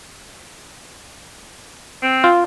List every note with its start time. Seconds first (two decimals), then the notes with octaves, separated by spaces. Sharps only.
2.02 C4
2.24 F4